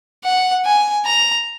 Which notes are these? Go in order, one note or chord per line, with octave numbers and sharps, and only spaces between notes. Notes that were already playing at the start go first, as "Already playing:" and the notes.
F#5
G#5
A#5